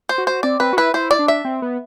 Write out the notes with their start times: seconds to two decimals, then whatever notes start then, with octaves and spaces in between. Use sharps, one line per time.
0.09 C5
0.18 F#4
0.27 C5
0.43 C4 D5
0.60 C4 B4
0.73 F#4
0.77 E4 B4
0.94 E4 C5
1.11 D5
1.19 D4
1.28 E5
1.45 C4
1.62 B3